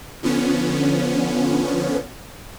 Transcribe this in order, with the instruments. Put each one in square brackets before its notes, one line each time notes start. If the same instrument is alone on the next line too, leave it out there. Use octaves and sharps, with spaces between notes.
[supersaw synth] D3 F3 B3 C#4